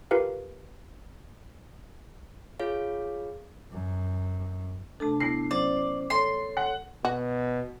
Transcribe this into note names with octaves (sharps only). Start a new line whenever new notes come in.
F4 G4 A#4 B4 F5
F4 G#4 C#5 F5
F#2
C3 A3 D4 A4 A5
B3 E4 A#6 C7
F#3 C#4 C5 D5
A4 C#5 C6
F#5
B2 F#4